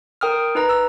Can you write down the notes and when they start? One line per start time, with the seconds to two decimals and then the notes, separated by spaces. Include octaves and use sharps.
0.21 A#4 G5 D#6 F6
0.55 D#4 B4 A#5
0.69 E6